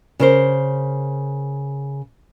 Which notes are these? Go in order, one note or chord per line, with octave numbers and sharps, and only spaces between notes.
C#3 A#4 C5